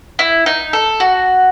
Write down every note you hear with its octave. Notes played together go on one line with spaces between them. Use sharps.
E4
D#4
A4
F#4